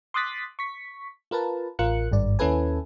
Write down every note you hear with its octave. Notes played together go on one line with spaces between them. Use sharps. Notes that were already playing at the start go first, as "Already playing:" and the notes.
C6 D6 D#6 F#6 A6 B6
C#6 B6
F4 A#4 B4 A5
A1 F4 A#4 F#6 C#7
G#1 G2 D5
D#2 C#4 E4 A4 B4 G#5